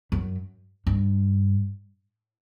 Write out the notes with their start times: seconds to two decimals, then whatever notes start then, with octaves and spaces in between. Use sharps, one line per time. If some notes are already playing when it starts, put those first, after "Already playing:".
0.12 F#2
0.87 G2